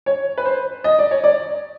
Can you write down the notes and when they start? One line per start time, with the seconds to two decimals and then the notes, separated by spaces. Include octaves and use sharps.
0.06 C#5
0.38 B4
0.46 C5
0.84 D#5
0.99 D5
1.11 C#5
1.24 D5